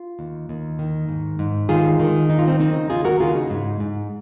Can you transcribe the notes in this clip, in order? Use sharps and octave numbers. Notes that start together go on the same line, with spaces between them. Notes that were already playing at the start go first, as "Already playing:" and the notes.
Already playing: F4
D#2
D#2
D#3
G#2
G#2
D#3 F4 G#4
D#3
D#2 D#4
F4
C4 D#4
C#3 C4 D#4
D#2 F4 G#4
F#4 A#4
C#3 F4 G#4
D#4 F#4
G#2
G#2